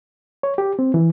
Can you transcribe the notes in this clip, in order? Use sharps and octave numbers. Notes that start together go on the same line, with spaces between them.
C#5
G4
C4
E3